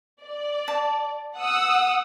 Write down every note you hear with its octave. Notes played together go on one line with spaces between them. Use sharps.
D5
A5
F#5 D#6 E6